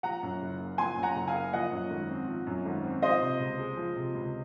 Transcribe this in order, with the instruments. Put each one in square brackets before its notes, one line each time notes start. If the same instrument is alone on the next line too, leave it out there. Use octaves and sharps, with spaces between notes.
[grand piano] F3 [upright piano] F#5 A#5
[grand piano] F#2
F#1
A#3
[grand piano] F3 [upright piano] G#5 C6
[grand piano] F#2
[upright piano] F#5 A#5
[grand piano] F#1
[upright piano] F5 G#5
[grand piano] A#3
[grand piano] F3 [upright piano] D#5 F#5
[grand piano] F#2
G#1
C4
F3
F#2
G#1
C4
[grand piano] F3 [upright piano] C5 D#5
[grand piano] C3
C#2
G#3
F3
C3
C#2